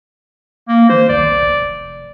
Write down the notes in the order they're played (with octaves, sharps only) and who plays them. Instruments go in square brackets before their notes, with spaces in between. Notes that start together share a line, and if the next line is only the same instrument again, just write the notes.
[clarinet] A#3
[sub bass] D#3 [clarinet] C5
[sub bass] B1 [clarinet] D5
[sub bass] F1